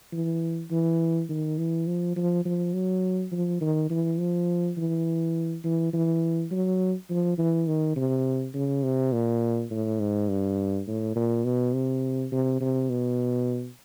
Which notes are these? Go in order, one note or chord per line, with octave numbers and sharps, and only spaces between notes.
E3
E3
D#3
E3
F3
F3
F3
F#3
F3
D#3
E3
F3
E3
E3
E3
F#3
F3
E3
D#3
C3
C#3
C3
A#2
A2
G#2
G2
A2
A#2
B2
C3
C3
C3
B2